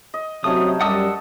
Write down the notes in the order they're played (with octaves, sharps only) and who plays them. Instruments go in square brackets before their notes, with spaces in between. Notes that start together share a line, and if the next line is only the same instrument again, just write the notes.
[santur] D#5
[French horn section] C3 F#3 [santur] A3 C#4 D#4 [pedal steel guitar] D#6
[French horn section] F#2 G3 [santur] D5 D#5 A5 [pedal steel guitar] F#5 D#6 E6